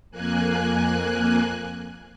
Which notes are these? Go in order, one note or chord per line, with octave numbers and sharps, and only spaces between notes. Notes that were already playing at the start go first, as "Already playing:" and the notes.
F2 A#3 G#5 F#6